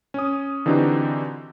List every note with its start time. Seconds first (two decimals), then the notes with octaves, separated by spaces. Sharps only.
0.14 C#4 D#6
0.66 D3 E3 C4 D#4 F#4 G4